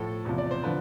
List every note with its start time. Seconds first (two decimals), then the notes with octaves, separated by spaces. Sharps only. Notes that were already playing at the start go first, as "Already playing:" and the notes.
Already playing: A2 F3 A4
0.25 E2 C3 F3
0.38 D5
0.51 C5
0.64 D3 F3 B4